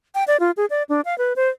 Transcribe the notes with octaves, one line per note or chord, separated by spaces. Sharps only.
G5
D5
F4
G#4
D5
D4
F5
B4
C5